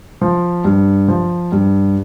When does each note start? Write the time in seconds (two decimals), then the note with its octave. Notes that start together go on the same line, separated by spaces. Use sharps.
0.21 F3
0.65 G2
1.08 F3
1.52 G2